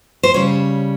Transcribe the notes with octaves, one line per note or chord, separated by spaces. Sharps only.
C5
C#3 G3 C#5